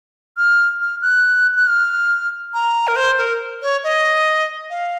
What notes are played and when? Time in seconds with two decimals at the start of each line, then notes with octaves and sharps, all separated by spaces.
0.37 F6
0.81 F6
1.02 F#6
1.56 F#6
1.67 F6
2.54 A#5
2.88 A#4
2.96 C5
3.18 A#4
3.62 C#5
3.84 D#5
4.70 F5